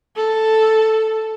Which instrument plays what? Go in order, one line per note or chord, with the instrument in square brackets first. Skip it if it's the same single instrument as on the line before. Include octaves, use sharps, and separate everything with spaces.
[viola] A4